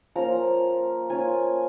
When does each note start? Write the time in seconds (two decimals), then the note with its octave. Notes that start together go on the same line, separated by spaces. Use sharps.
0.15 F3 A#3 C#4 F4 A#5
1.10 A#3 C#4 F4 G#5